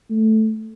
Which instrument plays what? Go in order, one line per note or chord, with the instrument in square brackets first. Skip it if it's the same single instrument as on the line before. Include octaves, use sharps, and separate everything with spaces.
[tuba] A3